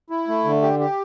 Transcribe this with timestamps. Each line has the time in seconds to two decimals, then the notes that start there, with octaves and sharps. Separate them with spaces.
0.10 E4
0.28 A3
0.45 D3
0.62 G4
0.79 G4